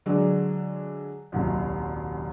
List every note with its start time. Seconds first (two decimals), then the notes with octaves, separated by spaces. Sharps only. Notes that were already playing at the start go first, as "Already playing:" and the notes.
0.06 D3 F#3 G#3 D4
1.32 D#1 C2 F#2